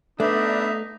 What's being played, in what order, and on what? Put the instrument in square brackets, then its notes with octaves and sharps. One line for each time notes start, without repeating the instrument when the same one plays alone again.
[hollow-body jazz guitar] A3 [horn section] B3 D4 [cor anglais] D#4 [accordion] E5